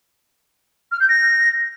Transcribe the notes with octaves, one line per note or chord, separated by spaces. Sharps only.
F6
G6
A#6